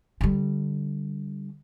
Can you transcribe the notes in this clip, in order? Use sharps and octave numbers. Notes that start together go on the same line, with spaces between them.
D3 G3